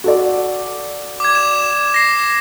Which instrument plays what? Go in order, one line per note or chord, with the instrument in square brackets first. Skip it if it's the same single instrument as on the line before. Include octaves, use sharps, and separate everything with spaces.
[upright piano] F#4 A4 D5
[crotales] D6 G#6
E7
A#6 C7